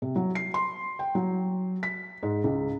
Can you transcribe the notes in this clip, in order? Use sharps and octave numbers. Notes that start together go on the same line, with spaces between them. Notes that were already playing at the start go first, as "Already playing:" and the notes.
C3
F#3
C7
C6
G5
F#3
B6
G#2
C#2